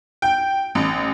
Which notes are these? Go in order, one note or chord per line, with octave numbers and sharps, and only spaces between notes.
G5
A1